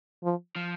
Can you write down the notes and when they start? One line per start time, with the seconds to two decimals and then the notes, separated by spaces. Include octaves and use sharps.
0.23 F3
0.56 F3